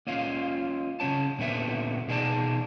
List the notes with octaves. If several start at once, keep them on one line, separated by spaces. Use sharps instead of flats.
A#3 C#4 F4 F5
C#3 E3 C#4 C#5 A5
A#2 D3 B3 E5
B2 D#4 G#4 A#4 D5 A5